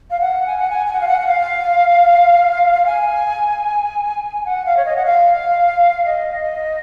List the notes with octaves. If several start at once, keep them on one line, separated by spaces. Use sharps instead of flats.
F5
F#5
G#5
F#5
G#5
G#5
F#5
F5
F#5
F#5
F5
G#5
F#5
F5
C#5
D#5
F#5
F5
D#5